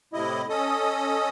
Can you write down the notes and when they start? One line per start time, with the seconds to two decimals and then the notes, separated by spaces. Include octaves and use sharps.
0.13 A2 C3 E4 D#5
0.49 C#4 A4 D#5 D#6